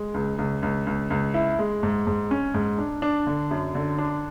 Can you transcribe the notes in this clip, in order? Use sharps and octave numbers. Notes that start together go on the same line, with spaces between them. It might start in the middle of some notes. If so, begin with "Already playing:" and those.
Already playing: G#3
C#2
C#2
C#2
C#2
C#2
E4
G#3
G#2
G#2
C#4
G#2
D4
D4
D3
F#2
D3
D4